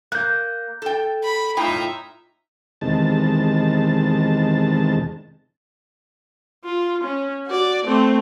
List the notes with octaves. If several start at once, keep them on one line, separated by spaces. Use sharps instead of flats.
A#3 F#6 G6
A4 G5
B5
A2 D#4 F4 E5 G5
E2 C3 D#3 G#3 A5
F4
C#4
F#4 D5
A3 C4